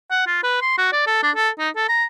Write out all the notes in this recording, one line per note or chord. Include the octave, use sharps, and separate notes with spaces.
F#5
F4
B4
C6
F#4
D5
A4
D4
A4
D#4
A4
A#5